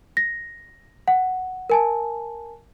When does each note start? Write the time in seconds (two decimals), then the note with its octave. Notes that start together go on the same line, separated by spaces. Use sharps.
0.17 A#6
1.08 F#5
1.70 A#4 G#5 A5